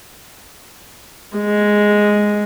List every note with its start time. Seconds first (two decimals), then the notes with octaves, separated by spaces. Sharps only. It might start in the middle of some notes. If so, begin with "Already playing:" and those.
1.37 G#3